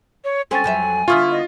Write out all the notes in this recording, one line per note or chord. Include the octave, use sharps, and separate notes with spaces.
C#5
C4 C#4 A4 G5 G#5 A6
F2 F#3 E5
D3 B3 E4 F4 C#6 F6
D#5